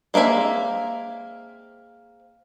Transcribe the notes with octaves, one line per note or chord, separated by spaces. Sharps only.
G#3 A#3 C4 E5 G#5